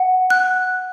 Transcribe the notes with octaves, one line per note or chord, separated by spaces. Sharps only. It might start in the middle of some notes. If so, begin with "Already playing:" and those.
Already playing: F#5
F#6